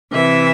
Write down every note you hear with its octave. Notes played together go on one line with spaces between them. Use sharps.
C3 E3 E5